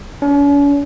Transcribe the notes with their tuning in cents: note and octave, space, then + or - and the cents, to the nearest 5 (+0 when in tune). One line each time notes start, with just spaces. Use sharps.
C#4 +45